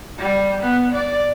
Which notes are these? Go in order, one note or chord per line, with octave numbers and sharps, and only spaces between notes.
G3
B3
D5